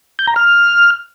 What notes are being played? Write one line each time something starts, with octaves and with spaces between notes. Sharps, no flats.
G6
A#5
F6